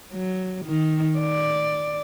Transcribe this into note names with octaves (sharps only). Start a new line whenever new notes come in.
F#3
D#3
D5